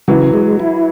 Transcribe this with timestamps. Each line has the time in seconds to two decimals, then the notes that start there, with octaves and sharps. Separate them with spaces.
0.08 C#3 E3 F#3
0.34 G#3
0.60 E4